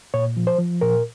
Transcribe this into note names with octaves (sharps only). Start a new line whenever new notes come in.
A#2 C#5
F3
C5
F3
A#2 A#4